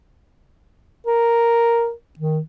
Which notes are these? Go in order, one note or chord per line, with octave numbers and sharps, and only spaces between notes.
A#4
D#3